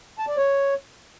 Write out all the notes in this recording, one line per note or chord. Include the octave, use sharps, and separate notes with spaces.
A5
D5
C#5